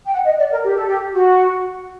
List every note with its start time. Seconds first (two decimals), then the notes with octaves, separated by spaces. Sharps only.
0.05 G5
0.12 F#5
0.25 D#5
0.37 D5
0.51 A#4
0.64 G4
0.75 A4
0.87 G4
1.14 F#4